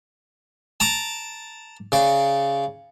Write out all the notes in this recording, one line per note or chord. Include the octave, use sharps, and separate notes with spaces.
A5 A#5 D6
C#3 D5